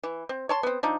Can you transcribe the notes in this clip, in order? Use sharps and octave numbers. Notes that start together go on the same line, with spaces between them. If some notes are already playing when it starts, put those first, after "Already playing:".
E3
C4
C#5 A5 C6
B3 C4
F3 D4 D#4